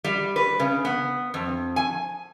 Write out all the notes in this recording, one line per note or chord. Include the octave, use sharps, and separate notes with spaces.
G3
B4
C#3
B3
F2
G#5